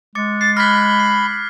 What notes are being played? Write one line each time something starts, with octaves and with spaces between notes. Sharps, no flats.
G#3 D6 A6 C#7
A6 C7
B5 F6 F#6 G#6 A#6 B6
C7